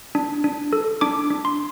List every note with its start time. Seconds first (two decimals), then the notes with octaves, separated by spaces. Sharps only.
0.15 D4
0.44 D4
0.73 A4
1.01 D4 D6
1.30 D4
1.45 C6